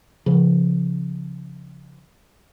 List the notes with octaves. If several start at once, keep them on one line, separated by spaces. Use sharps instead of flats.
C#3 F3